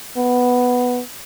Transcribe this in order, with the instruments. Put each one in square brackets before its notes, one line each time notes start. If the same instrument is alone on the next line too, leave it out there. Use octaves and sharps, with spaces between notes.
[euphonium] B3